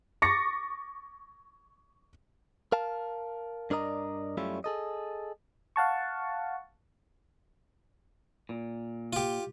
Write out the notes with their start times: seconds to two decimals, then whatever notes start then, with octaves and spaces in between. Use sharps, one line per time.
0.22 C#6 D6 A6 A#6 C#7
2.72 A#4 F5 A5
3.70 G2 D4 A#4 D5 D#5 A#5
4.37 F#2 G3 A3 C#4 E4 F4
4.64 G#4 A4 D#5
5.76 F5 F#5 A5 C#6
8.49 A#2
9.13 F4 G4